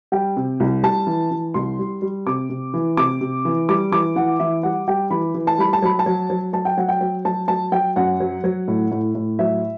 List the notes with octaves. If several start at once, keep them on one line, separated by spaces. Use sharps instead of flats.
G3 G5
C3
C2
G3 A5
E3
E3
C2 C6
G3
G3
C3 D6
C3
E3
C3 D6
C3
E3
G3 D6
E3 D6
E3 F#5
E3 E5
G3 F#5
G3 G5
E3 B5
E3
A5
G3 B5
A5
F#3 B5
A5
F#3
F#3
F#3 A5
G5
F#3 F#5
G5
F#3
F#3 A5
F#3 A5
F#3 G5
F#2 F#5
F#3
F#3
A2
A2
A2
F#3 E5